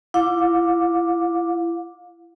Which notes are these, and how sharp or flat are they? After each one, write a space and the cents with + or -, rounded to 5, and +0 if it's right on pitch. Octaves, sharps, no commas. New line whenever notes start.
E4 +35 F5 +40 D6 +0